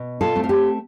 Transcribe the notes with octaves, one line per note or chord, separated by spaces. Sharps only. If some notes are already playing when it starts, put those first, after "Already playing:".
Already playing: B2
F4 A4
A3 C4
F4
G4